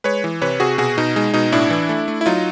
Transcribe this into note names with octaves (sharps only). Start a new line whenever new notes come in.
G#3 B4 C#5
E3
C3 B4 C#5
C3 F#4 G#4
B2 F#4 G#4
B2 D#4
G#3 D#4
B2 D#4
A2 D4 E4
E3
A3
A3
E4
F#3 D#4 F4